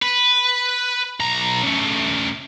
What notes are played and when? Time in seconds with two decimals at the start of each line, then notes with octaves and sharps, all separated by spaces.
0.02 B4
1.20 B1 A#5
1.64 C#3 A3